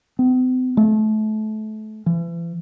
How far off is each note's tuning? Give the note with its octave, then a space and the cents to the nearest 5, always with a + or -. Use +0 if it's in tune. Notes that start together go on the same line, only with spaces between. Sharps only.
C4 -45
A3 -30
E3 +40